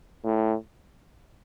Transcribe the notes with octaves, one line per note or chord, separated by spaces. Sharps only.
A2